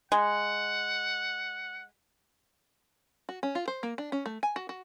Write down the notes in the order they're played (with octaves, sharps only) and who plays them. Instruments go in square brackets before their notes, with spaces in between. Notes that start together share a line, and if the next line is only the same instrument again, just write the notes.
[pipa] G#3 [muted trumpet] F#5
[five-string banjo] F#4
C#4
F4
C5
A#3
D4
C#4
A3
G#5
F#4
F#4